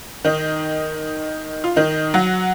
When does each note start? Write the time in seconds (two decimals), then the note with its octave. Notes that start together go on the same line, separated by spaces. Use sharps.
0.25 D#3 D#4
1.64 F4
1.76 D#3 D#4
2.14 F#3 F#4